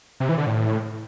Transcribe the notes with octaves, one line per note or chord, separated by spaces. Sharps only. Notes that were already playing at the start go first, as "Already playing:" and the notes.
C3
E3
D3
A2